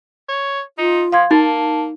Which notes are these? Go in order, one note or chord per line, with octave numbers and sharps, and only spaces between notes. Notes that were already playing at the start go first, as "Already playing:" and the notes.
C#5
D#4 F4
F3 F5 C6 G#6
A#3 D#4 A5